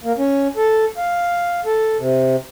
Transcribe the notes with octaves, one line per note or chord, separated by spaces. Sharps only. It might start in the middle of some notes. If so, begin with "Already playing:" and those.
A#3
C#4
A4
F5
A4
C3